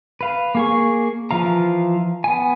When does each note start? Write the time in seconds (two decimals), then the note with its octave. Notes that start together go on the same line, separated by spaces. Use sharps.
0.21 B4 F5
0.55 A#3 G#4 C#6
1.31 E3 F3 F5 A#5
2.24 B3 G#5